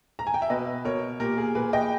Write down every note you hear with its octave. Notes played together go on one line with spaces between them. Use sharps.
A#5
G#5
G5
E5
B2 B4 D#5
B2 A#4 C#5
A#2 G4 A#4
G#4
A#2 G#4 B4
D#5 G5